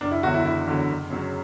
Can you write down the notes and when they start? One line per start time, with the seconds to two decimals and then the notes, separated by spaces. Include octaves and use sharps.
0.01 F#1 D4
0.11 E4
0.23 E2 D3 F#3 F#4
0.34 E4
0.44 F#1 E4
0.67 E2 D3 F#3
0.88 F#1
1.10 F#2 C#3 F#3